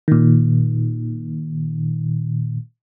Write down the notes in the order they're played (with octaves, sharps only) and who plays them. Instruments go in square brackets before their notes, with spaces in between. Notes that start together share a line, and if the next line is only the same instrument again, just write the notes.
[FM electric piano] A#2 D#3